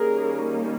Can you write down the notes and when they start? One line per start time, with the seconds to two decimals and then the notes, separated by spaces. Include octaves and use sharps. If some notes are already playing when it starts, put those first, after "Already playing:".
Already playing: D#3 G3 A#3 C#4 G#4 A#4